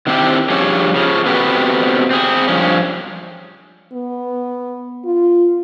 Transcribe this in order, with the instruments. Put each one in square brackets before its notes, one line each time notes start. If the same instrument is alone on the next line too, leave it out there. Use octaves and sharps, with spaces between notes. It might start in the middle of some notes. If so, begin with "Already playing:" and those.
[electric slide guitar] D#3 C4 D4 E4 G4 C5
G2 F3 C#4 G4 G#4 C#5
C#3 F3
B3 C4 F#4 G4 A4 B4
C4 G#4
G2 F3 C#4
[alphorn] B3
F4